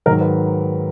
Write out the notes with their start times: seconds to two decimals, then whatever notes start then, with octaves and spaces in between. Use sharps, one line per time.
0.06 G#2 D#3 F#3 A#4
0.21 B4